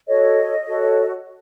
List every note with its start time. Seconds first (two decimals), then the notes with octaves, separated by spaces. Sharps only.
0.07 F#4 A4 C#5 D#5
0.66 F#4 A4 C#5